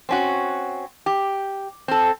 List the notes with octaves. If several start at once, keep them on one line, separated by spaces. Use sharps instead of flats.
C4 C#4 F#4
G4
C4 A4